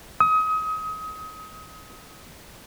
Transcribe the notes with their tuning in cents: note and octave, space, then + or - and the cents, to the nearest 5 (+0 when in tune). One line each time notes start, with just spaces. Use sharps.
D#6 +30